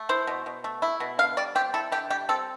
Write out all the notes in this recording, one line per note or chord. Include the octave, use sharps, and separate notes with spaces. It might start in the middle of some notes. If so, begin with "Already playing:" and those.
Already playing: A3
E4 C5
B2
B2
A3
E4
B2
D3 F5
G3 D5
C4 G4
E4 A4
D3 G4
G3 G4
C4 A4